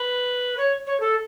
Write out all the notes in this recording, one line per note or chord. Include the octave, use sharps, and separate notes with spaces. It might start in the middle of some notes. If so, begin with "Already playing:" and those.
Already playing: B4
C#5
C#5
A4